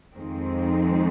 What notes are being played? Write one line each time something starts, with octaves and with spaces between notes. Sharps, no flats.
F2 D#3 G#3 C4